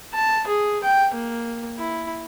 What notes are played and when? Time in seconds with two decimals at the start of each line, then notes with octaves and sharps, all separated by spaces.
0.14 A5
0.47 G#4
0.84 G5
1.14 A#3
1.78 E4